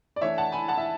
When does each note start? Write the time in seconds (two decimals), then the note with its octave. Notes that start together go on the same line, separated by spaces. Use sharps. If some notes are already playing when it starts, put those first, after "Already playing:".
0.16 D5
0.21 E3 A3 D4 C#5 E5
0.38 F#5 A5
0.52 G#5 B5
0.68 F#5 A5
0.78 E5